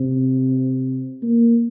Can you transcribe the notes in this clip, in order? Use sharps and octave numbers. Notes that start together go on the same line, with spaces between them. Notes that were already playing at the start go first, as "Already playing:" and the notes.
Already playing: C3
A#3